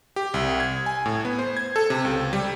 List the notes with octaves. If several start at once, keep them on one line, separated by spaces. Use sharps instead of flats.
G4
C2
G#6
G#5
A2
B3
C5
G#6
A4
C3
C#2
G3